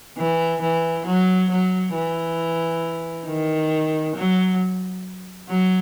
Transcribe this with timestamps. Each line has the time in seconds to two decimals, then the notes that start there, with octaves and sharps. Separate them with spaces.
0.17 E3
0.61 E3
1.06 F#3
1.50 F#3
1.94 E3
3.27 D#3
4.16 F#3
5.49 F#3